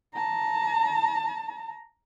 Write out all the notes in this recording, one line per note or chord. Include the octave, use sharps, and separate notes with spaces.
A5 A#5